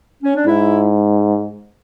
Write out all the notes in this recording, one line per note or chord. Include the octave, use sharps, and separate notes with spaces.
C#4
D4
G#2 E4